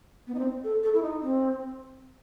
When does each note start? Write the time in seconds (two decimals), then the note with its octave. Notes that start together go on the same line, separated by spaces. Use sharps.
0.27 B3
0.34 D#4
0.39 C4
0.64 A4
0.83 A4
0.93 E4
1.02 D#4
1.21 C4